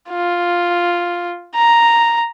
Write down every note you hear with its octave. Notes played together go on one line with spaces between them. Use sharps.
F4
A#5